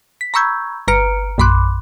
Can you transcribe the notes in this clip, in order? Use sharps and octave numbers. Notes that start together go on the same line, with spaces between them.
B6
A#5 B5 C#6 E6 G6 G#6
G1 B4 A#5 F6 C#7 D7
A#1 F#2 B5 C6 D6 F#6